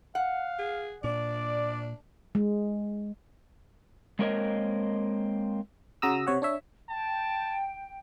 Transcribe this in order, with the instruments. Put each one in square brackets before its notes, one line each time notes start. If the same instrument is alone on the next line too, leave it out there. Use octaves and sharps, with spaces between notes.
[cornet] F5 [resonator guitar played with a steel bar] F#5
[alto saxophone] G#4
[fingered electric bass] A#2 [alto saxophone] D4 [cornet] D5
[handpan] G#3
[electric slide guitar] G#3 A#3 C4 A#4 C#5 D#5
[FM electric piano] C#3 F#4 A#5 D#6 E6
C3 C#5 F#5
D4 C#5 E5
[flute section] G5 [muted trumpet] A5